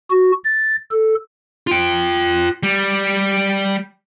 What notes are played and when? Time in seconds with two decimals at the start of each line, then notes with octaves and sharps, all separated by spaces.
0.10 F#4
0.44 A6
0.91 A4
1.67 F4 G5
2.63 G3